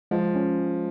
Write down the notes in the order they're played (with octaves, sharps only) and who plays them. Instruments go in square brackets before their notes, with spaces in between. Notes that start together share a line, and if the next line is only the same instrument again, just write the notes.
[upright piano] F3 [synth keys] G#3
[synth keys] C#4